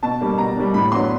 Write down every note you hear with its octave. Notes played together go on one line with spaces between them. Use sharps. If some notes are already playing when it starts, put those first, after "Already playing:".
B2 A5
G3 A#3 D4
B2 A#5
G3 A#3 D4
A2 B5
F#3 B3 D4 C6